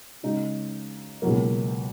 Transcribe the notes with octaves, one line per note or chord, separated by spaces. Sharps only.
C#3 G#3 D#4 F#4
C#2 B2 F#3 A#3